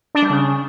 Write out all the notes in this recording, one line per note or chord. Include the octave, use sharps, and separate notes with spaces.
D4
G3
C#3